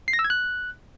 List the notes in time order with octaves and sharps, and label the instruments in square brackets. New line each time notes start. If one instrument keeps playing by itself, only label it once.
[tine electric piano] C7
A#6
E6
G#6
F#6